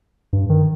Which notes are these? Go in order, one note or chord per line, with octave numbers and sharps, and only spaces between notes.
G2
D#3